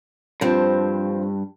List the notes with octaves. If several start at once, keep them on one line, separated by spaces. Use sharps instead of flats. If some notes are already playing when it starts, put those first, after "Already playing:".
G2 F3 C4